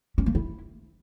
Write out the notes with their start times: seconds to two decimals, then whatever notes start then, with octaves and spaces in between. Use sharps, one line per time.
0.18 C#4
0.26 A#3
0.35 E4